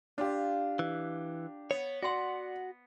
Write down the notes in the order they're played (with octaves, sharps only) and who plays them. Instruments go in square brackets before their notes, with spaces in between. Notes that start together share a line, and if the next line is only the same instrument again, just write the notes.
[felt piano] D4 G4 [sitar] F4
[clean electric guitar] E3
[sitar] B3 [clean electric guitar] C#5
[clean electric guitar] F#4 F#5 [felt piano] D5 C6